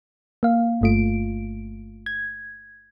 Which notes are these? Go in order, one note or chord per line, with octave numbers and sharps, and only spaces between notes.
A#3 F5
G1 G2 A3 F4 D7
G#6